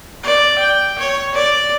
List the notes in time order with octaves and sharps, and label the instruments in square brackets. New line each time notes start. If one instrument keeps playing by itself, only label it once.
[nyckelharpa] D5
G5
C#5
D5